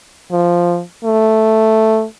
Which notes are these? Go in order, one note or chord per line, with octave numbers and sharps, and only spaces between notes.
F3
A3